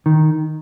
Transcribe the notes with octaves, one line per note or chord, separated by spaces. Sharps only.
D#3